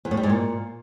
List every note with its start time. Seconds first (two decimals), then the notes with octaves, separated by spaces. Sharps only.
0.05 E2
0.11 A2
0.17 G3
0.23 G#2
0.30 A#2